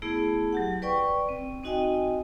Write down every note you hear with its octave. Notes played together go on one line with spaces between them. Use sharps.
A3 B3 E4 G#4
F#3 G4 F#5
B4 D5 G5 C#6
C4
C4 D#4 F#4 D#5 G5 G#5